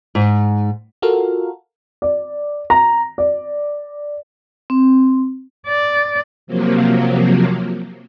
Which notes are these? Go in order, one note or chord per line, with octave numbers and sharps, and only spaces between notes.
G#2
F4 F#4 A4 A#4 F5
D5
A#5
D5
C4
D5
C3 F3 F#3 A#3